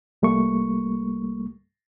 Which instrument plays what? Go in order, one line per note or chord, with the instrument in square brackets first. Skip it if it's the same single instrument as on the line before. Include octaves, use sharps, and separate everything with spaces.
[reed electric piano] C2 G3 A3 A#3 C#6